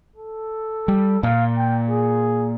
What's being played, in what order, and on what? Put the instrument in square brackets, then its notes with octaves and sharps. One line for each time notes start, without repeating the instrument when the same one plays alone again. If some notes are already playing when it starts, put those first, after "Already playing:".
[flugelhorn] A4
[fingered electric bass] G3
[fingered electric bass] A#2 [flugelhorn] F5
[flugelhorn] G5
G#4